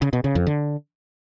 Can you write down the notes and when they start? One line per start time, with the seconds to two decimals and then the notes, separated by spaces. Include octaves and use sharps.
0.02 C#3
0.13 B2
0.24 C#3
0.35 F2
0.47 D3